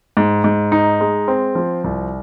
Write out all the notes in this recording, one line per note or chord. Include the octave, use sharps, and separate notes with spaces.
G#2
G#2
D#4
G#3
C4
F3
C2